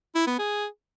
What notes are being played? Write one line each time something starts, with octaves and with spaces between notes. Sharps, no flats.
E4
B3
G#4